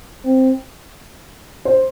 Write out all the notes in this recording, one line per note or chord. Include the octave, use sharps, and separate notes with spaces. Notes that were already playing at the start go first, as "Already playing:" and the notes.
C4
C5